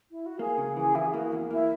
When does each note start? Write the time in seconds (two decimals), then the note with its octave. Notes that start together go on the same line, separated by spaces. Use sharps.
0.11 E4
0.26 F#4
0.39 A#3 G#4
0.58 C#3
0.76 E3 G#4
0.95 E3 E4
1.05 G#4
1.14 A#3 F#4
1.32 E2
1.51 A#3 E4